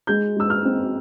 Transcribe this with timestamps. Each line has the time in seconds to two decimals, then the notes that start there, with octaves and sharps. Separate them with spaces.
0.07 G#3 G6
0.37 G#3 E6
0.50 F6
0.65 C4